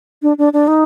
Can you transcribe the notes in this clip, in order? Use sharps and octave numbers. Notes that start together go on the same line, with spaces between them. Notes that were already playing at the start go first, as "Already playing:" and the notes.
D4
D4
D4
D#4